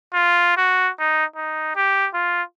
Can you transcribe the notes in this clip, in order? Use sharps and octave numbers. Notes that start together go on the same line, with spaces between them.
F4
F#4
D#4
D#4
G4
F4